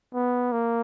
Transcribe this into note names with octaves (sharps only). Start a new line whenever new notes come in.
B3
A#3